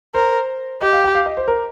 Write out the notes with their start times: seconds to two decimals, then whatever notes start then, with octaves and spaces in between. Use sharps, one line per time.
0.14 A#4 C5
0.81 G4 D#5
0.93 F5
1.04 G5
1.15 F5
1.26 D#5
1.37 C5
1.48 A#4